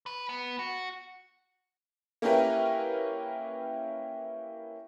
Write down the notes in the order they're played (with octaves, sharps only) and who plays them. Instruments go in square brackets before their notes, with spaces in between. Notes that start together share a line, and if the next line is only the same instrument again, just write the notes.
[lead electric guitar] B4
B3
F#4
[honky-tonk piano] A#3 C#4 E4 G4 A#4 B4